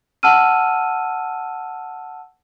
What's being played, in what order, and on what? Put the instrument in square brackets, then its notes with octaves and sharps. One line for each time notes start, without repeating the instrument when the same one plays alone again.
[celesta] F#5 A5 E6 F6 D#7